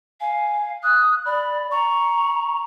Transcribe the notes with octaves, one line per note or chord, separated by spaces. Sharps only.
F5 G#5
D#6 F#6
D5 B5
A#5 C#6